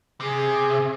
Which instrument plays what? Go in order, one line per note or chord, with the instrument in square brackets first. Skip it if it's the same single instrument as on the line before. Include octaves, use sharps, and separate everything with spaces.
[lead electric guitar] C3 [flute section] G#4